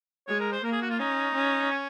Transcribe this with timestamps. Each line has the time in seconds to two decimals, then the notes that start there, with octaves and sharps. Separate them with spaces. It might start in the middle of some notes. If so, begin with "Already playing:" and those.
0.28 G#3 C#5
0.40 A#4
0.52 C5
0.64 A#3 A#4
0.72 G#4
0.82 F#4
0.90 F4
0.99 C#4 D#4
1.35 C#4
1.71 C#4